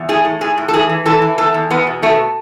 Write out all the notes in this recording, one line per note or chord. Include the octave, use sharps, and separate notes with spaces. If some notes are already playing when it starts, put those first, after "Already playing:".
Already playing: E2
A2 G#4
A2
A2 G#4
A2
A4
E3 G#4
E3
E3 A4
E3
E2 A4
E2
E2 B3
B2
B2 A3